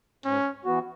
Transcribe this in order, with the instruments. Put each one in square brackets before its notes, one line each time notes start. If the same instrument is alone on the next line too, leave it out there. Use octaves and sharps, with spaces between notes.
[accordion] G#2 [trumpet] C#4
[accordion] E3 B3 F#4